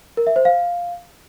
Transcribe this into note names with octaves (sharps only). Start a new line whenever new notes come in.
A#4
E5
C5
F5